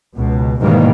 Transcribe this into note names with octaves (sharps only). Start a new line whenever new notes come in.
C#2 B2
G#2 B2 D#3 E3 G3 A#3